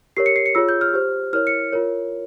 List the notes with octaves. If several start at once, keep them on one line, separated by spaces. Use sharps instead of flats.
G4 A#4 C#5 C7
C#7
C7
C#7
F4 G#4 C#5 E6
G6
F6
G4 C5
E4 A#4 C#5 F6
C#7
F4 A#4 C#5